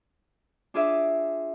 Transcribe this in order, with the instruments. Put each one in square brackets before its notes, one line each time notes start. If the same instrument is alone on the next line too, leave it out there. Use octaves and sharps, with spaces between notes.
[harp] D4 F4 G#4 D5 E5